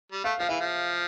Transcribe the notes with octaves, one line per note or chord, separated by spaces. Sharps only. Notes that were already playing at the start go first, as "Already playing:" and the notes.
G3
A3 F5
F3 F5
E3 E5
F3